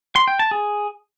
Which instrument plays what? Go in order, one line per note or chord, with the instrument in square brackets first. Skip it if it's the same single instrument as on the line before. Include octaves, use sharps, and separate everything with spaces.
[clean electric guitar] C6
G5
A5
G#4